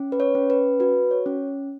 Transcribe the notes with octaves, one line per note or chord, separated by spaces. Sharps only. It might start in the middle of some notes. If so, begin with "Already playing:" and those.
Already playing: C#4
B4
C#5
C#4
B4
F#4 B4
C#5
C#4